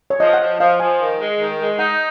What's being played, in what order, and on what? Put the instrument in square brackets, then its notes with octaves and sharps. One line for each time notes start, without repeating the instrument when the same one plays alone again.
[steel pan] C#5
[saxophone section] F3 [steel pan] D#5
[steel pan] F#5
[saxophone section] F3
[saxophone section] F3 [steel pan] F5
[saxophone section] F3 [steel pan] G#5
[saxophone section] D#3
G#3
D#3
G#3
[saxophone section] D#4 [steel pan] F#5